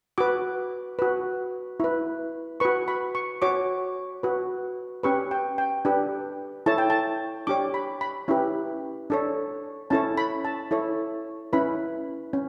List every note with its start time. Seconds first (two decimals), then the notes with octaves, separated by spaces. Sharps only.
0.18 F#4 B4 D6
0.99 F#4 B4
1.80 E4 B4
2.60 F#4 B4 C#6
2.88 B5
3.15 C#6
3.42 F#4 C#5 D6
4.23 F#4 B4
5.03 C#4 G4 B4 C#6
5.31 G5
5.58 G5
5.85 D4 G4 B4
6.66 E4 A4 C#5 A5
6.78 G5
6.90 A5
7.47 D4 G4 C#5 D6
7.74 B5
8.01 B5
8.28 C#4 E4 G4 B4
9.10 D4 A4 C#5
9.90 C#4 E4 A4 C#5 A5
10.18 B5
10.45 A5
10.71 E4 A4 C#5
11.53 C#4 E4 B4 B5
12.33 C#4